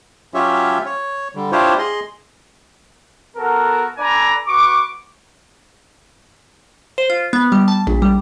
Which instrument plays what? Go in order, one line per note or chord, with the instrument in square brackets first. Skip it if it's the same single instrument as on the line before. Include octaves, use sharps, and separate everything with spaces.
[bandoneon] F#3 C#4 F4 G4 C#5 E5
C#5
D3 G3
D4 E4 F4 G4 C5 C#5
G#4 D#5 C6
[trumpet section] B3 F#4 A4 A#4
D4 A4 B4 D5 G#5 A#5
F#4 B4 C#6 D6
[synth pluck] C5
F4
B3
G3
A5
A#1
G3